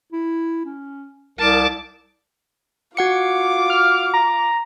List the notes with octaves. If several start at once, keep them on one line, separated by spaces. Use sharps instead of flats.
E4
C#4
C2 A#4 A5 D6
F4 F#4 F#5 D6 C#7
F6
A#5